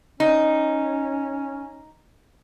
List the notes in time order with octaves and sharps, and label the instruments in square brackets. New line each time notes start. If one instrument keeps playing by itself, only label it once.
[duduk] C#4 [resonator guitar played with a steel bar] D#4